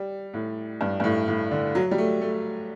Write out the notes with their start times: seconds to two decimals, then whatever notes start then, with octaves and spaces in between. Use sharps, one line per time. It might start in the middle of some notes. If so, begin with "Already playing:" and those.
Already playing: G3
0.34 A2
0.81 G2
1.00 G2
1.04 A2
1.28 A2
1.51 D3
1.75 F#3
1.91 G3
1.98 A3
2.21 A3